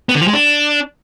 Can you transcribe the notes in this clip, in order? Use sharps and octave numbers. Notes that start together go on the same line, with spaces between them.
B3
D3
F3
G#3
D4